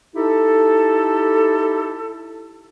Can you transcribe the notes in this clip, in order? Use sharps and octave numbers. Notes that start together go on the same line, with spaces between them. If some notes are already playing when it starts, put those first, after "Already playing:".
D#4 E4 G4 A4